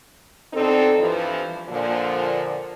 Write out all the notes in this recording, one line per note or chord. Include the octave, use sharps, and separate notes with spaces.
B2 C4 D4 D#4 A4
G2 E3 F3
A#2 D3 F3